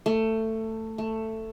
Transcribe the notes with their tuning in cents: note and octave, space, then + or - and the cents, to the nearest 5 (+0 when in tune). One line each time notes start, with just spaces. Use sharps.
A3 +15
A3 +10